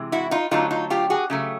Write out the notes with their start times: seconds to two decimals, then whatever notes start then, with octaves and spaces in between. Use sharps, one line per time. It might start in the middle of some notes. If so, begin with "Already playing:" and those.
Already playing: C3 E3 G#3
0.12 E4 F#4
0.31 D#4 F4
0.51 D3 F#3 A3 D#4 F4
0.71 D#4 F4
0.90 F4 G4
1.10 F#4 G#4
1.30 C#3 F#3 A3